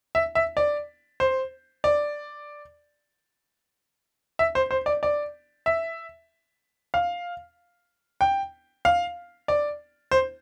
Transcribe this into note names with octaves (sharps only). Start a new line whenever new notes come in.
E5
E5
D5
C5
D5
E5
C5
C5
D5
D5
E5
F5
G5
F5
D5
C5